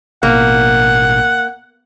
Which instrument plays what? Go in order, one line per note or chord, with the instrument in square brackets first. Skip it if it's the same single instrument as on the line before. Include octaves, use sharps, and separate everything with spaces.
[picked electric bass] A1 B2 [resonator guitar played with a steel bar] A#3 [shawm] F#5